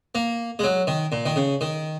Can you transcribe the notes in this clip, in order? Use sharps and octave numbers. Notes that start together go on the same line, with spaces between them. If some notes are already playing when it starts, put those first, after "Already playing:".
A#3
G#3
F#3
D#3
A#2
D#3
C#3
D#3